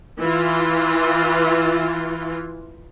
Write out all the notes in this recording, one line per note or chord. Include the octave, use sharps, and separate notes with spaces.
E3 F4